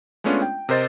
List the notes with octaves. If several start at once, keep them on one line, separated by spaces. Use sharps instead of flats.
G#3 A3 B3 C#4 D4 F4
G5
C3 A#4 C5 D#5 A6